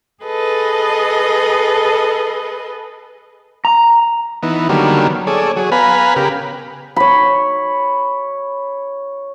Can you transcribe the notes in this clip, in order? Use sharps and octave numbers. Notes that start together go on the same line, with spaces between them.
G#4 A4 B4 D#5
A#5
E3 B3 D#4
D3 D#3 F#3 G3 A#3 B3
G#4 A4 C#5 D5
F#3 G#4
B3 B4 F5 G#5 A#5 B5
C#3 G4 A#4 B5
C#5 B5